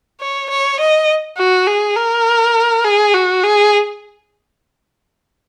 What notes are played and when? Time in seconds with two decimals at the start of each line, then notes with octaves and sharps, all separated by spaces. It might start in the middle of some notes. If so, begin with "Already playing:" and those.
0.21 C#5
0.50 C#5
0.80 D#5
1.37 F#4
1.67 G#4
1.96 A#4
2.85 G#4
3.14 F#4
3.43 G#4